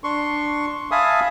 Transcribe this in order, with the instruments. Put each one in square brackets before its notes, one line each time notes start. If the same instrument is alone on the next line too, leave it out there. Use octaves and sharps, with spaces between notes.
[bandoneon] D4 C6 C#6
E5 F5 G#5 A5 B5 D#6